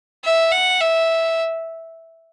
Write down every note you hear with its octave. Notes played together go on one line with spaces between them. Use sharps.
E5
F#5
E5